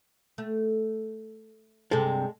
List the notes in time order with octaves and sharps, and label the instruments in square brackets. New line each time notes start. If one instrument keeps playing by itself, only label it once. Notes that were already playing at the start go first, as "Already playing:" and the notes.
[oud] A3
[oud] G2 C3 [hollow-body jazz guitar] G#3 A4